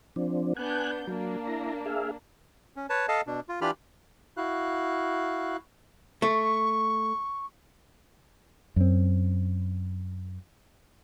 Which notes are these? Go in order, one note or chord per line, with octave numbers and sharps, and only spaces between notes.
F3 C4 D4
B3 D4 G#5 F#6 G6
F#3 A#3 D4
E4 A#5
G#4 E5 F5
C#4
B4 C#5 A5
A4 D#5 F5 A5
B2 D4
F4
E3 D4 F4 G4 B5 F6
E4 F#4 F5 F#6
A3 C#6
F#2 C4